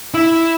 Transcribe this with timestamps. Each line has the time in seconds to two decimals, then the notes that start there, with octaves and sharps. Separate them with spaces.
0.14 E4